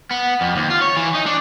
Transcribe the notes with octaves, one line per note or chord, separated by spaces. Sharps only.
B3
F2
D#2
F4
C#5
E3
D#4
D4